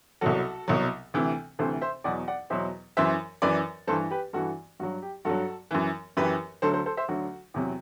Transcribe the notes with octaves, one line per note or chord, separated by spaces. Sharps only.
C2 B2 F#3 F#4 A4
C2 B2 F#3
D2 C3 E3
D2 C3 E3 A4 C5
C5 E5
E2 B2 F#3 D5 F#5
D5 F#5
E2 B2 F#3 C5 E5
F#2 E3 C5 E5
F#2 E3 B4 D5
G2 E3 A4 C5
G4 B4
G2 E3 F#4 A4
G2 F#3 F#4
G4
G2 F#3 F#4 A4
F#2 E3
F#2 E3 G4 B4
D2 D3 F#3 A4 C5
A4 C5
A4 C5
C5 E5
D2 D3 F#3 F#4
E2 C3 F#3